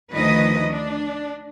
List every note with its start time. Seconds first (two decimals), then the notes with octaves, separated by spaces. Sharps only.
0.13 D2 D#3 F3 B4 D#5
0.70 D4